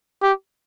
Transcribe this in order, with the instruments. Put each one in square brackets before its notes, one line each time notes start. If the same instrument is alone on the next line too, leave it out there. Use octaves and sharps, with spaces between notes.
[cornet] G4